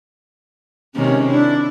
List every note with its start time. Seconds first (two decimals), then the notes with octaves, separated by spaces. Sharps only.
0.95 C3 D#3 G#3 C#4
1.30 D4 E4